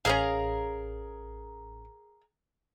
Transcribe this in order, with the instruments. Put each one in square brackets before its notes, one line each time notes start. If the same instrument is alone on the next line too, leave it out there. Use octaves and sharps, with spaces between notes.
[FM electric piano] A1 [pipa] C#4 D#5 F5 [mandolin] G#4 A#4 A#5